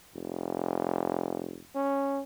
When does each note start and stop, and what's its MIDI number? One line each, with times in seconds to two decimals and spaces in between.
0.14 1.63 29
1.75 2.22 61